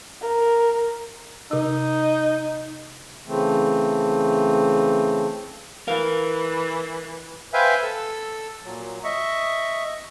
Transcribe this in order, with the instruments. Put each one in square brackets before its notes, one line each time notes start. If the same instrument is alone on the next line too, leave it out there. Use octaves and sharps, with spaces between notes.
[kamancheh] A#4
[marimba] C3 E6 [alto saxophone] D#4
[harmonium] C#3 E3 A3 C4
[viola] E3 [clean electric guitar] A#4 F5
[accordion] B4 C5 E5 F5 G5 G#5
A4 E6
A#2 F#3
D#5 E5 C#6